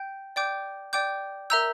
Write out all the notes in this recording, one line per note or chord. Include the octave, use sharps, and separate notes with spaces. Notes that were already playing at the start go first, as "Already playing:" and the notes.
Already playing: G5 G6
D5 G5 D6 G6
D5 G5 D6 G6
A#4 E5 A#5 E6 G6